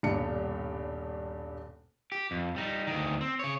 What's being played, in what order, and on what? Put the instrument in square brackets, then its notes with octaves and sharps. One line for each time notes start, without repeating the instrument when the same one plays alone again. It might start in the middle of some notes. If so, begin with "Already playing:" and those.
[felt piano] D#1 B1 G2 D4 C#7
[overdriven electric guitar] G4
F2
G3 D#4
D2 D#3
C4
C#3 C#5